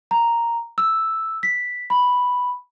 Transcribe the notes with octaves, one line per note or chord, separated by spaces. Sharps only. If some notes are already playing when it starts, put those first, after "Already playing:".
A#5
E6
B6
B5